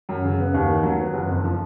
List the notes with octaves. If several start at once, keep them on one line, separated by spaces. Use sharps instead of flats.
F#2
C#3
B3
D#2
D#3
F#3
B3
F#1
F2
F3